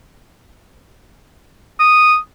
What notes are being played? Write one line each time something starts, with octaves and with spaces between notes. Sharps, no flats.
D#6